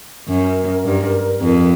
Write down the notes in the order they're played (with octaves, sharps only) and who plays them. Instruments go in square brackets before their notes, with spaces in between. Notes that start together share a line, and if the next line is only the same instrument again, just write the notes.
[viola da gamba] F#2 [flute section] A#4
[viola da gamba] G2
F2